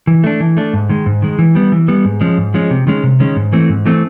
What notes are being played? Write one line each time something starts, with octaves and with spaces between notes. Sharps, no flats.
E3
A3 D4
E3
A3 D4
G#2
D#3 G#3
G#2
D#3 G#3
E3
G3 B3
E3
G3 B3
G#2
F3 G#3 C#4
G#2
F3 G#3 C#4
C3
D#3 G#3 C#4
C3
D#3 G#3 C#4
G#2
E3 A3 C4
G#2
E3 A3 C4